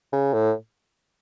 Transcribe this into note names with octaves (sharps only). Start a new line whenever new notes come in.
C#3
A2